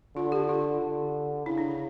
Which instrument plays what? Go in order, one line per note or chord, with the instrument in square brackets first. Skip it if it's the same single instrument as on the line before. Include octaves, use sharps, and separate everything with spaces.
[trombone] D3 [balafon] F4
[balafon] G4
F4
[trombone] D3
[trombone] C#3 [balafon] E4
[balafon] D4
E4